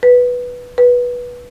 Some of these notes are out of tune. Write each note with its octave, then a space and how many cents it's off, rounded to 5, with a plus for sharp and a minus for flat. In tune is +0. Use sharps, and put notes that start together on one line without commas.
B4 -5
B4 -15